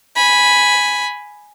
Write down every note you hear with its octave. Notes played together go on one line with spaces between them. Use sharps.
G#5 B5